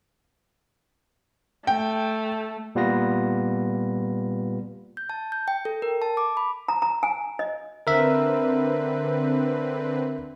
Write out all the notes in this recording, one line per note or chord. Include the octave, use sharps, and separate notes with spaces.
A3 G5
A#2 G3 B3 F4 B4 A#6
G6
A5
G6
G5
A4
A#4
A5
D6
B5
A#5
A#5
G#5
D#5
D3 C4 A#4 B4 E5